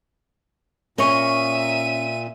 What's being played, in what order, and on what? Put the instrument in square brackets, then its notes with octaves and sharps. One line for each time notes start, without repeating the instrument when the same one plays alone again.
[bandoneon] A#2 [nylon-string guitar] C#4 [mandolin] A#4 D#5 C#6 [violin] E5 D#7